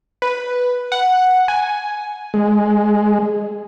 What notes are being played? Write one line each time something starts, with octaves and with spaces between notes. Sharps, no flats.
B4
F#5
G#5
G#3